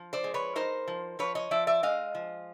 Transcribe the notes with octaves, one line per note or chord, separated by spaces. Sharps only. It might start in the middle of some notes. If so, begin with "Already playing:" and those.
Already playing: F3
C5 D5
G#3
B4 C#5
D#4 A#4 C5
F3
F3 B4 C#5
C#5 D#5
F3 D5 E5
D5 E5
G#3 D#5 F5
F3